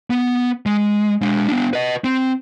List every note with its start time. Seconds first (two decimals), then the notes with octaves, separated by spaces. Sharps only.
0.10 B3
0.66 G#3
1.22 G#3 D4
1.48 B3 D4
1.73 B4 D#5
2.04 C4